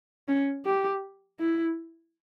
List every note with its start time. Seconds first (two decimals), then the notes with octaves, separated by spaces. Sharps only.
0.28 C#4
0.65 G4
1.39 E4